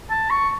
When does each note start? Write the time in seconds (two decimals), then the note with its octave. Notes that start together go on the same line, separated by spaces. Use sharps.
0.10 A5
0.30 C#6